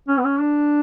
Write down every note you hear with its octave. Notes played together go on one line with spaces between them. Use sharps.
C#4
B3
C#4
D4